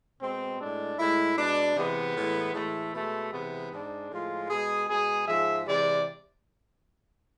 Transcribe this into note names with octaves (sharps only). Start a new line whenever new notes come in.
B2 G#3 C4
A2 G#3 D4
A2 G#3 E4
B2 G#3 D4
C3 E3 G#3 B3
A2 E3 G#3
A2 E3 G#3 A3
B2 G#3 A3
C3 E3 G#3 B3
G#2 G#3 D4
A2 F3 G#3 F4
B2 G#3 G#4
B2 G#3 G#4
G#2 F3 G#3 E5
C3 E3 G#3 D5